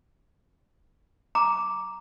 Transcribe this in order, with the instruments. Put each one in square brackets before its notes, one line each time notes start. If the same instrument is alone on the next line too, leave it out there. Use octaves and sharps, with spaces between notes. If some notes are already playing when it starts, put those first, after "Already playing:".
[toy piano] A#5 D6